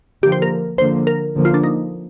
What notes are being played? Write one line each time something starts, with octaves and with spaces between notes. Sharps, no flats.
D3 F3 A#3 G4
C5
A#4
D3 F3 A#3 C5
A#4
D3 F3 A#3
F4
D4
D#4